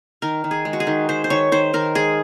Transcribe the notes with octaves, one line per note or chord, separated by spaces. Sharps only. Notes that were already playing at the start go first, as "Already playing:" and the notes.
D#3 A#4
D#3
G#4
G#3
F#4
G#4
D#3
D#3 C5
C5
D#3 C#5
D#3 C5
D#3 A#4
G#3 G#4